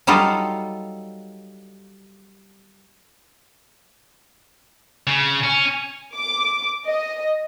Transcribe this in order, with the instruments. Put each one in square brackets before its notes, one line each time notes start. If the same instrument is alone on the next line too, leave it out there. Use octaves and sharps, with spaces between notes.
[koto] F#3 G3 D#4 F4 A4
[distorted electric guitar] C#3
C#4
[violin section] D6
D#5